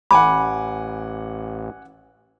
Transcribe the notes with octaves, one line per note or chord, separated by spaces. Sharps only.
A1 F#5 G#5 B5 D6